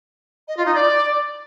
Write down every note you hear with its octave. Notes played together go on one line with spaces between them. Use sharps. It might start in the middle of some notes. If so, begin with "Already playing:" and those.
D#5
F4
D#4
D5